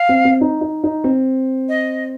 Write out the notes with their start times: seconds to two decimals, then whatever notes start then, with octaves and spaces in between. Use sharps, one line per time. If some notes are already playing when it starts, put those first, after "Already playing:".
Already playing: F5
0.09 C4
0.25 C4
0.41 D#4
0.61 D#4
0.84 D#4
1.04 C4
1.69 D#5